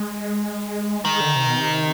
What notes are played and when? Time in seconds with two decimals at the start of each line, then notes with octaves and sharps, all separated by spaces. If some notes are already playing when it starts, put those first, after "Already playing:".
Already playing: G#3
1.05 D#3 G#3
1.21 D3
1.36 C3
1.46 B2
1.58 C3